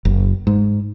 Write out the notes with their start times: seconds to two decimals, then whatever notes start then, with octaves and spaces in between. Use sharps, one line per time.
0.05 F#1
0.47 G#2